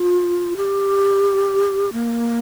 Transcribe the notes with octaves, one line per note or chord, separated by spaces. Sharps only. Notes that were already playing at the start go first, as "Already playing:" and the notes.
Already playing: F4
G4
A#3